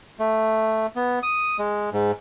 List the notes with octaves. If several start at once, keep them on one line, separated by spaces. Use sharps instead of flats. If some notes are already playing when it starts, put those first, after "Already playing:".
A3
B3
D#6
G#3
G#2